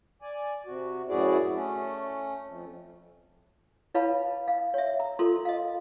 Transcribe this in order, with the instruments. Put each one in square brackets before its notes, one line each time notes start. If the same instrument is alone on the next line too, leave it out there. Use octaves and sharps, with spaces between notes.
[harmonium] D5 G#5
C3 F#4
F#2 A2 E4 F#4 G#4 D5
A3 C#4
F2
[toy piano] E4 B4 C#5 F5 A5 B5
F5
C#5 E5
A#5
F4 A4 A#4 A#5 C6
D#5 F5